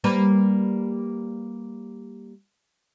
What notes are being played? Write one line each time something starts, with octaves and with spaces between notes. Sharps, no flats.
G3 A#3 B4